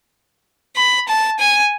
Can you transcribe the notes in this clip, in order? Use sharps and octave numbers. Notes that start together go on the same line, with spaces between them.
B5
A5
G#5